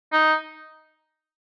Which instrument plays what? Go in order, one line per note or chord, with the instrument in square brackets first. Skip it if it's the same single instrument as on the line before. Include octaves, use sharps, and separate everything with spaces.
[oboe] D#4